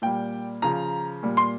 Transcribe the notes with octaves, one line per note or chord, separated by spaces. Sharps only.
A#2 G3 G5
C#3 F3 A#5
A#2 G3
C6